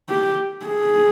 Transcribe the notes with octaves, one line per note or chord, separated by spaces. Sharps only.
G4
G#4